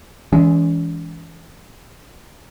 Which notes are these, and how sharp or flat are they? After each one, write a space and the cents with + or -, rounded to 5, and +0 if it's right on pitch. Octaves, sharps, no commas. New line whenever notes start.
E3 +0 G#3 +0 C#4 +45